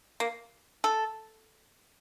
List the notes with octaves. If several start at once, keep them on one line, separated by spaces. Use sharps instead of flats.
A#3
A4